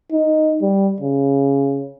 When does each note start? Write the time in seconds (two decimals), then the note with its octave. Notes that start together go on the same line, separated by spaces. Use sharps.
0.12 D#4
0.62 G3
1.01 C#3